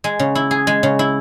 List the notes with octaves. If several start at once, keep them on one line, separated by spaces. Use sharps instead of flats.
G#3
C#3
E4
G#4
G#3
C#3
E4